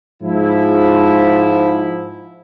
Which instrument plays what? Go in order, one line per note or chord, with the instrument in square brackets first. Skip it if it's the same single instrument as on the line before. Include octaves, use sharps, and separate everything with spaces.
[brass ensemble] G#2 F3 E4